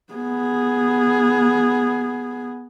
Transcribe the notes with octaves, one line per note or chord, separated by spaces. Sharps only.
B3 G#4